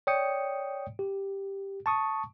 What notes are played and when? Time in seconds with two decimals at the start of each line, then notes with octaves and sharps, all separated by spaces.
0.07 C#5 D5 G5 D#6 C#7
0.99 G4
1.86 A5 C#6 D#6